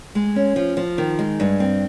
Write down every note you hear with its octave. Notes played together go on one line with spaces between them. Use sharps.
G#3
C#4
F3
F3
D#3
G#3
G2
C4